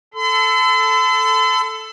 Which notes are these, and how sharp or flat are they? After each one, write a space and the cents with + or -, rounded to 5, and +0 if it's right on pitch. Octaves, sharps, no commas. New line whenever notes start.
A4 +0 C6 -45